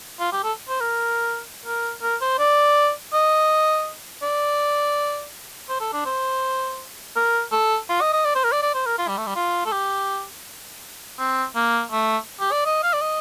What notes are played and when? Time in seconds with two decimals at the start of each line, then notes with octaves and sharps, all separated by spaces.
0.20 F4
0.32 G4
0.44 A4
0.69 C5
0.81 A#4
1.66 A#4
2.03 A#4
2.21 C5
2.39 D5
3.13 D#5
4.23 D5
5.69 C5
5.81 A4
5.93 D4
6.06 C5
7.16 A#4
7.52 A4
7.89 F4
8.01 D#5
8.13 D#5
8.25 D5
8.35 C5
8.44 A#4
8.52 D5
8.63 D5
8.74 C5
8.86 A#4
8.98 F4
9.08 G3
9.18 A3
9.27 G3
9.35 F4
9.66 A4
9.72 G4
11.19 C4
11.56 A#3
11.92 A3
12.40 G4
12.52 D5
12.66 D#5
12.83 F5
12.93 D5
13.01 D#5